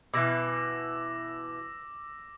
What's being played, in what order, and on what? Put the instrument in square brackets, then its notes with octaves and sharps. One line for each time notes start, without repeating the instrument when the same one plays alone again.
[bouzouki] B2 E3 [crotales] D6 E6 A#6